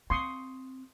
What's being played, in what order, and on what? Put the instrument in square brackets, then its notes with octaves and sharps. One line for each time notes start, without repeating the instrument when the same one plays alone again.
[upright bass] C4 [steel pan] C6 C#6 D#6